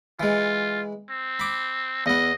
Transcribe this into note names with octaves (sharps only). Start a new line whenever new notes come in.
E3 G#3 F4
C4
B5 D6
E2 B3 D#5